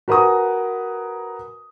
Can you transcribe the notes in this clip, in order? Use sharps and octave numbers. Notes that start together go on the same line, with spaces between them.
F#4 A#4 B4 G#5 D#6